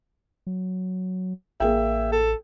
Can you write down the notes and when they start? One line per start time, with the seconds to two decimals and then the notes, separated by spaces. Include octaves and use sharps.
0.47 F#3
1.60 A1 A#3 G#4 E5 G5
2.12 A4